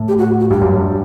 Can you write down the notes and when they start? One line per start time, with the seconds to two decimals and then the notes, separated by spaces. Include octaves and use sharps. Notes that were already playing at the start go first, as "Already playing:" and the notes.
Already playing: A2
0.08 G4
0.18 F#4
0.40 F#4
0.50 G2 G4
0.62 F#2
0.73 G2